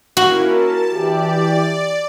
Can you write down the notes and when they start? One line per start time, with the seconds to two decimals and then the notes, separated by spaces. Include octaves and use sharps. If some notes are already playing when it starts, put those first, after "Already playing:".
0.17 A#3 C#4 E4 F#4
0.49 A#4 A5
0.94 E3 G4 D5